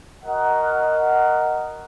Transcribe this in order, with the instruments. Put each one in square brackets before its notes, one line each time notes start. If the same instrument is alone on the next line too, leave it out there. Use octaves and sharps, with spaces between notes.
[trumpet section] F#4 A#4 D#5 F#5